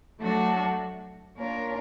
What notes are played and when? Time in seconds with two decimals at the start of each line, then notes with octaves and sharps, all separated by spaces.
0.20 F#3 A3 D4 F#4 A4
1.36 A#3 D4 F4 A#4 C#5